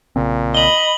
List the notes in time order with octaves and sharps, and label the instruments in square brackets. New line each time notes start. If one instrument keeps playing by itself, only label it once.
[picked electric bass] B1 C#3 C4 [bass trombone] A#2
[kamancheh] D#5 B5 [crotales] F#7 G7